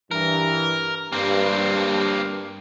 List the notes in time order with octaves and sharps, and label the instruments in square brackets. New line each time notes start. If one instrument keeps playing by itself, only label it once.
[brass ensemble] G2 E3 [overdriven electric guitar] A#4
[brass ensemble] G2 [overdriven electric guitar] A#3 C4